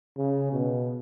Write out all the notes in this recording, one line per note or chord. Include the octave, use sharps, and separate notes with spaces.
C#3
B2